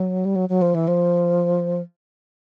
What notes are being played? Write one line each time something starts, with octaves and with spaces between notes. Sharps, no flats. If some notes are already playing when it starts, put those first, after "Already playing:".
Already playing: F#3
G3
F#3
F#3
F3
E3
F3